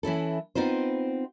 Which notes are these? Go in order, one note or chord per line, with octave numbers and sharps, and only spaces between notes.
E3 C#4 E4 A4
B3 C4 D#4 F4 C5